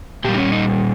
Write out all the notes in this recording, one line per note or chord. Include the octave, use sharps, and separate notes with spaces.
A#2 G3 G4
D#4
C#4
D#4